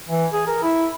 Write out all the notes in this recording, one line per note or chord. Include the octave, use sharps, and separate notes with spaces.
E3
G#4
A#4
E4